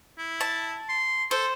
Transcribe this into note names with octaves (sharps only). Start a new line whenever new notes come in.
E4
A5
C6
A4 C5